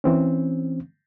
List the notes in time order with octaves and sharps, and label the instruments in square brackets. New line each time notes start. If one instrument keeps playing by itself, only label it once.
[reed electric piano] E3 C4 C#4